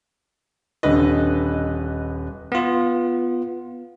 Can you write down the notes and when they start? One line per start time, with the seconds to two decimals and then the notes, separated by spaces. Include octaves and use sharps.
0.83 D#1 D3 B4 D#5
2.52 B3 F4